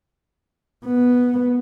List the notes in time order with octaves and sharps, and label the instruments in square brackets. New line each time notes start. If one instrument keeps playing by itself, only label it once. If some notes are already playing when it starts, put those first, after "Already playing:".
[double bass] B3